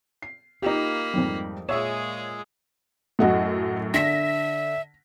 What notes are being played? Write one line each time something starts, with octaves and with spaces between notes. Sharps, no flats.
C7
A#3 D#4 F4 G4 F5 A#5 B5
F2 G#2 G3
A#2 G#3 G#4 C#5 E5 E6 E7
F#2 A2 F#4 D#5 F#5
D3 E5 A#6 B6